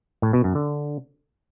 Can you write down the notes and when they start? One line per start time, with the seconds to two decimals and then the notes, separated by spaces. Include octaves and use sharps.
0.22 A2
0.33 B2
0.44 F#2
0.55 D3